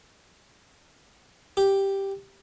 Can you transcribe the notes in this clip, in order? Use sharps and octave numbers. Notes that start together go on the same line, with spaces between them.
G4